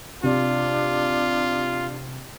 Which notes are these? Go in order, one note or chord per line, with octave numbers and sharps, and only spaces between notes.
C3 D4 F4